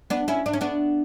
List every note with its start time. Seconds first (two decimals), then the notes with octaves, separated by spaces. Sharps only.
0.10 B3 D4
0.28 C#4 E4
0.46 D4
0.53 C#4
0.61 B3 D4